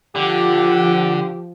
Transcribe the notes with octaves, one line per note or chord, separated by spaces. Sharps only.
D3 F3 G4 F#5